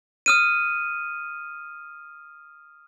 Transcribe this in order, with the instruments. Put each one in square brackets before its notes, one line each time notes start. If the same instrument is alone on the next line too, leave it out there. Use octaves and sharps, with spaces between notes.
[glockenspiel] D#6 F6 D#7